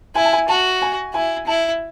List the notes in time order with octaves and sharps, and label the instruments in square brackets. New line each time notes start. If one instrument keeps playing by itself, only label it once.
[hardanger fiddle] E4 [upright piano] G#5
[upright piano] A5
G#5
[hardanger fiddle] F#4 [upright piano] A5
[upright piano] G#5
[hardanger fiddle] E4 [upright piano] G#5
[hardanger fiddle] E4 [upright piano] A5